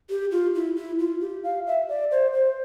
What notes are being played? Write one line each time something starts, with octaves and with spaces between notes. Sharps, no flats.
G4
F4
E4
E4
F4
G4
F5
E5
D5
C5
C5